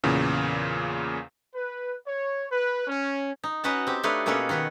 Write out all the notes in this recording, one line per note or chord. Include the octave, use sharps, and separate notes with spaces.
E2 A#2 C#3
B4
C#5
B4
C#4
D#4
C#4 D#4 F#4 B4 F#5 A5
C4 G4
A3 D4 D#4 B4 C#5 F5
B2 A#3 C#4 A4 B4 C#5
D#3 F#4 B4 C#5